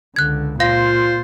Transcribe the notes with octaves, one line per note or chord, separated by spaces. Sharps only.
C#2 D3 F#6 G#6
A#2 F4 C5 F5 A#6